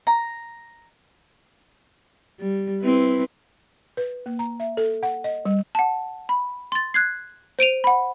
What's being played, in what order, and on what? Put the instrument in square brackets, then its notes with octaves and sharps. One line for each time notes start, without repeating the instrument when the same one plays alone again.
[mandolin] A#5
[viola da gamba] G3
C4 E4 B4
[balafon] B4
A#3
A#5
E5
A4
F#5
D#5
G3
[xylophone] F#5 A5
B5
C6 A6
F#6 G#6 C7
C5 D7 D#7 F7
F#5 B5